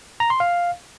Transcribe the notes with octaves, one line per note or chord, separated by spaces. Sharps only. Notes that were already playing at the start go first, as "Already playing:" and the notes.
A#5
C6
F5